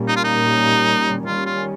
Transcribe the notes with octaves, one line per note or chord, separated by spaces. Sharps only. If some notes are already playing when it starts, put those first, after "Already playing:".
Already playing: A#2 G3 A#3 C#4
D#4
F4
D#4
D#3 G3 C#4 F4
F4